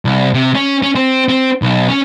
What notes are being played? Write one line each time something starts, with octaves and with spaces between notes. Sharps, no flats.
C2
C3
C#4
C#4
C4
C4
B1
C#4